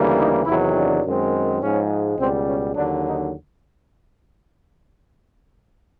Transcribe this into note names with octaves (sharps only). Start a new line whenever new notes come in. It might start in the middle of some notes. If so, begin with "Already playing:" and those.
Already playing: D2 C#3 E3 G3 A#3
D#4
E2 C3 D#3 F#3 E4
D4
F#2 D#3 G#3 C4
G#2 F3 G#3 C#4
C#2 B2 G3 C4
C#4
D#2 D3 F#3 D4
D#4